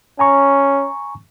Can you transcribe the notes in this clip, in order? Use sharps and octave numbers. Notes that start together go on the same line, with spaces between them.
C#4 G#5 A#5 C#6